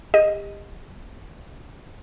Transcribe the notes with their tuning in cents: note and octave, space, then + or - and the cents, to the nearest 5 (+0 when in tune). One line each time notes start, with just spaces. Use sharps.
G4 +35 D#5 +0